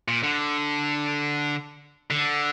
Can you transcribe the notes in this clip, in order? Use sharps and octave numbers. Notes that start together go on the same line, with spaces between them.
A#2
D3
D3